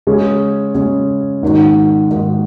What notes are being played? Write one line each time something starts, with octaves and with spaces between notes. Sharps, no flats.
C#3 G#3 C#4 G#4
C#3 G#3 C#4 G#4
G#2 D#3 A#3 D#4 F#4
G#2 D#3 A#3 D#4 F#4